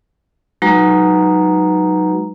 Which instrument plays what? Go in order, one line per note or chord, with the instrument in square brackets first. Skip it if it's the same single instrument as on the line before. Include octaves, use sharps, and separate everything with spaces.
[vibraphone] F#3 G#3 D#4 F#4 B4 A#5